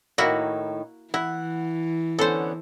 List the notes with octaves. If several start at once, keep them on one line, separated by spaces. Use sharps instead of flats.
A2 D#3 A#3 E4 F#4
E3 E4 F#5
D3 B3 C#4 A4 C5